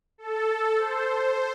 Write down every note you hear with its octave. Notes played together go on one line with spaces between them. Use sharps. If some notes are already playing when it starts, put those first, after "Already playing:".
A4
C5